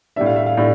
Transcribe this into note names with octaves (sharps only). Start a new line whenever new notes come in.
A2 G3 D4 E5
F5
E5
F5
A2 G3 D4